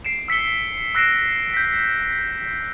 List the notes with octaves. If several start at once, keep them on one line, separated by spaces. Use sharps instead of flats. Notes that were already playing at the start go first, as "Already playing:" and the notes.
C7 D7 E7
E6 B6 C#7 G7
E6 F#6 A#6 C7 D7 E7
G6 B6